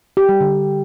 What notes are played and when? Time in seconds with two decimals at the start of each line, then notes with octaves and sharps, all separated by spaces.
0.17 G4
0.29 G3
0.41 D3